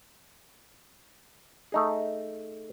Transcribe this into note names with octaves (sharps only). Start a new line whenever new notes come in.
A3 D#4 G#4